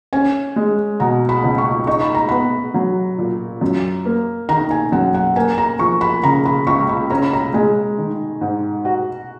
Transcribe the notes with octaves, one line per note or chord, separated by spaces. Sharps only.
C#4 G#5
G#3
B2 A#5
B5
C#2
C#6
D#4 C#6
B5
A#5
B3 B5
F#3
A#2
F#2
A#3
D#3 A#5
G#5
F#2 F#5
F#5
A#3 G#5
A#5
F3 C#6
B5
C#3 A#5
B5
C#2 C#6
B5
C#4 A#5
B5
A#5
G#3 G#5
D#3
G#2
F#4